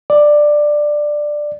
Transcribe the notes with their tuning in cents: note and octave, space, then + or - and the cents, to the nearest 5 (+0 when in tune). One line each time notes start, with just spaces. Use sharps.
D5 +10